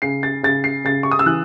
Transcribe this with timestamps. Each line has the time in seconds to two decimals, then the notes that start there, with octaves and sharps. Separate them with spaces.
0.02 C#3 C7
0.23 A6
0.43 C#3 A6
0.64 C7
0.84 C#3 A6
1.03 C#6
1.11 D#6
1.19 E6
1.26 E3 F#6